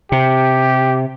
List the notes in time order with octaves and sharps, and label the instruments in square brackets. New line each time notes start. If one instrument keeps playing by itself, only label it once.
[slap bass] C3 [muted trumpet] G4